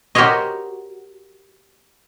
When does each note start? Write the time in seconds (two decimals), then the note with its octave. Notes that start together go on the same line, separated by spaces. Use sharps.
0.15 F#4 G4 A#4 C5 C#5 D#5